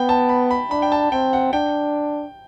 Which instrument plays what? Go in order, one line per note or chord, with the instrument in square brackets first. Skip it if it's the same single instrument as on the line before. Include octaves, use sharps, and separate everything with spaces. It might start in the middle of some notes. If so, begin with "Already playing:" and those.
Already playing: [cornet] B3 [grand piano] G5
[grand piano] A5
B5
B5
[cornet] D4 [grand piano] B5
[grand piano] G5
A5
[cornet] C4 [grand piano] G5
[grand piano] F#5
[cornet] D4 [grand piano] G5